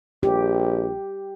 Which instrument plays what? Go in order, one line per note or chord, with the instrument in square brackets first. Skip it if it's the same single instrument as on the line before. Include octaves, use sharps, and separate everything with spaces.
[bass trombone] A#1 [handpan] G4